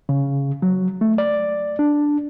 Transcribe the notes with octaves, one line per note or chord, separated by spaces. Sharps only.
C#3
F#3
A3
D5
D4